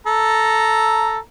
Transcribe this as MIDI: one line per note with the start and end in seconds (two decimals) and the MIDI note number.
0.07 1.18 69
0.07 1.18 82